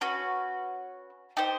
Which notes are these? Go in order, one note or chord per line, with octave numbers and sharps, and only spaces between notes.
C#4 F#4 B4
D#4 G4 C5